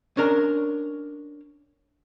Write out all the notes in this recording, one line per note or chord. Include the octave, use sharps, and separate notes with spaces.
C#4 D4 A#4 A#5